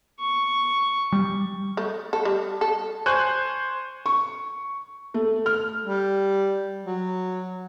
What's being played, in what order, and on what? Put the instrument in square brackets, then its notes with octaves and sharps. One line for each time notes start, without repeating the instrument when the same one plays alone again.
[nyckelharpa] C#6
[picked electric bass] G3
[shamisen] A3
A4
G3
A4
[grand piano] C5 G#5 C#6 F#6 G6
[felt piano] C#6
A3
F6
[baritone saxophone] G3
F#3